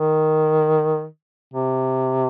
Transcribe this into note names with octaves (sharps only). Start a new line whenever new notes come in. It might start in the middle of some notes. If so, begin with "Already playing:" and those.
Already playing: D#3
C3